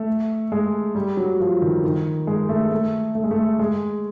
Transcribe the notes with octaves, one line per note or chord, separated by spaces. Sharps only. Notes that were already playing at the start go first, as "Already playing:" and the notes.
Already playing: A3
G#3
G3
F#3
F3
D#3
D#3
G#3
A3
A3
A3
G#3
A3
G#3